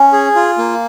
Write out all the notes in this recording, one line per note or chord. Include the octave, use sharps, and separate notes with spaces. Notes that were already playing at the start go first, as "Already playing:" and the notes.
Already playing: C#4 G#5
G#4
F4
A#3